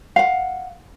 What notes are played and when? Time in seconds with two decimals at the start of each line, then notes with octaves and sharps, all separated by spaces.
0.16 F5 F#5